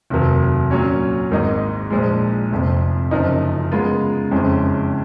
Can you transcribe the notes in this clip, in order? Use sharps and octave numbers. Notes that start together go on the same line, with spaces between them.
F1 D#2 D#3 F#3
A#2 F#3 C#4
G#1 G#2 D#3 A#3 D#4
A#1 A#2 F3 G#3
F1 F2 F3
F#1 F#2 F3 A#3 D#4
C#3 G#3 B3 F4 A#4
F#1 F2 F3 G#3 C#4